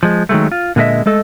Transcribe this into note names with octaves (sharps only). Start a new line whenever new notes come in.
F3 G#3
D#3 F#3 G#3 A3
F4
A#2 D3 G#3 F#4 D#5 E5
G#3 A3 A4 D#5